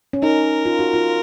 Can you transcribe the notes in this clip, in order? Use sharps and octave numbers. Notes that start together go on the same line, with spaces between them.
C#4
D#4 A#4
F4
F#4
F4